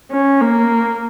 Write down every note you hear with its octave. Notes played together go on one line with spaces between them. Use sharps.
C#4
A#3